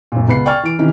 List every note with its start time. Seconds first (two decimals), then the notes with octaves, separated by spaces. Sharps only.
0.12 F#2 A#2
0.28 C#2 B3 C7
0.46 D5 G5 G#5 C#6 F6 A6
0.63 E3 D7
0.79 C3 D#3 E3 C#4